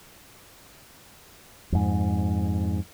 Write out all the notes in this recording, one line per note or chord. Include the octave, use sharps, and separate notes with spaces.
F2 G#2